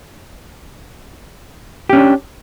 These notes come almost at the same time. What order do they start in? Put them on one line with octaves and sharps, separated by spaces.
G4 C#4 D4